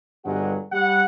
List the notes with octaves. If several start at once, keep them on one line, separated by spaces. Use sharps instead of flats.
G1 G2 F#3 G#3 G4 F#5
G3 F#5